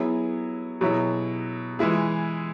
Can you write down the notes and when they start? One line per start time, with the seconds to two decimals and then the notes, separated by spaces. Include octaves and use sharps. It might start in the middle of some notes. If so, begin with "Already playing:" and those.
Already playing: F#3 B3 E4 G#4
0.81 B2 F#3 E4 G#4
1.79 E3 G#3 E4 G#4